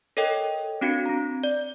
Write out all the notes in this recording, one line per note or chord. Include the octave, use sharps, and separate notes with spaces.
A4 A#4 C#5 D#5 G5
C4 D4 F#4 F5 G#6 C#7
C4 A#5
D5